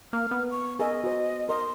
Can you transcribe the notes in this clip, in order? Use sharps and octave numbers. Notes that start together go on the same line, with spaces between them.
A#3 F6
B3
C#6
G#4 A#4 D#5 E5
F#4 C5
A#4 D#5 C6